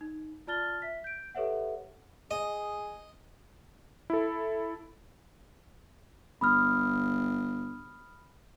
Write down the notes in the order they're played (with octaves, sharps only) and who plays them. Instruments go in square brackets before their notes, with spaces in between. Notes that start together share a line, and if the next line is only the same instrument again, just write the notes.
[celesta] D#4
F4 D5 A5 F6 A6 G7
E5 B6
G6 D7
G4 A4 B4 C#5 E5 F#5
[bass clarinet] G#4 [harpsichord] D#5
[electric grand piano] E4 A4
[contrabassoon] G1 [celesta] B5 D#6 F6